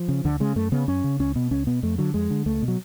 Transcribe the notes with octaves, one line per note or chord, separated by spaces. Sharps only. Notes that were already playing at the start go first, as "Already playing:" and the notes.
Already playing: F3
C#3
D2 D3
C#3 G#3
F#2 A3
C#3 B3
F#2 C#4
C#3
C#2 C#4
B2 B3
C#2 C#4
B2 B3
F2 A3
D3 F#3
F2 G#3
D3
C#2 A3
B2
F#3